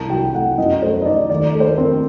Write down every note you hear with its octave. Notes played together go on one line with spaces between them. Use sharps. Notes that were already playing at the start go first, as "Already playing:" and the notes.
Already playing: C2 C3 A5
F#3 G5
A3 F#5
F#2 D#5
A3 C5
D#5
D#4 D5
D#2 D5
A3
C5
A#4
C4